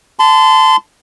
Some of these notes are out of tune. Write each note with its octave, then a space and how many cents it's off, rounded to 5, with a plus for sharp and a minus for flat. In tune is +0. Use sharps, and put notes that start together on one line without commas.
A5 -5 C6 -30